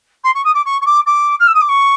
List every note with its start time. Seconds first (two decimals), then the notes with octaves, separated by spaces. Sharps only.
0.23 C6
0.34 C#6
0.44 D#6
0.54 D6
0.65 C#6
0.81 C#6
0.85 D6
1.06 D6
1.39 F6
1.47 E6
1.54 D#6
1.61 D6
1.68 C#6